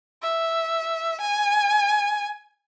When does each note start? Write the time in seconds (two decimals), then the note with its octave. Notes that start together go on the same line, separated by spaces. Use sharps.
0.23 E5
1.21 G#5